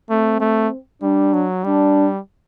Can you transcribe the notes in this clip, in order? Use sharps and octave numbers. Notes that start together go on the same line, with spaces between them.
A3 C4
A3
G3 D4
F#3
G3 D4